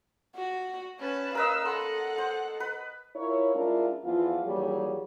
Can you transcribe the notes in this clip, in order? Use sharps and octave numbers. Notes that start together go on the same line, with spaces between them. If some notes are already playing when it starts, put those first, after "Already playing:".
F#4
C#4 B4 A5
A#4 B4 D#5 F5 E6
A4 F#5 C6
C5
B4
E4 F4 A#4 C#5
G#3 C#4 D4 E4 F4 A#4
E2 E3 F3 B3 F4
D#2 E3 F#3 G3 G4 G#4